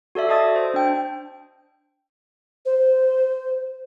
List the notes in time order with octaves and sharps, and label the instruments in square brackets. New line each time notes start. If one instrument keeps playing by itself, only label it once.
[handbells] F#4 A4 D5 E5
F#4 D#5 A5 D#6 A6
C5
D4 G5
[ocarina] C5